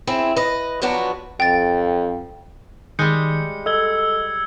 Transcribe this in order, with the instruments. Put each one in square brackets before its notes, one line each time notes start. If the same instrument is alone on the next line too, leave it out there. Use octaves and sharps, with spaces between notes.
[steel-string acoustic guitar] C4 E4 G#4
B4 D#5
F3 F#3 B3 D4 F#4
[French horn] F2 [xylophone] G5 A6
[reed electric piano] D#3 [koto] G3 G#3 [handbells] G6 [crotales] C#7
[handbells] A4 [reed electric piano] D#5 [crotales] E6 G#6 G7